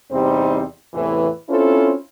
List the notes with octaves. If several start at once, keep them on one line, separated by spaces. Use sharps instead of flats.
E2 C3 G3 C4 D#4 C5
E2 A2 C3 E3
C4 C#4 E4 F4 A4 C5